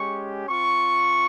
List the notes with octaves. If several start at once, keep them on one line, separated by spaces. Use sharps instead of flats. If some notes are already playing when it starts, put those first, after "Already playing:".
Already playing: G#3 C#4 G4 C#6
C4 F4 C#6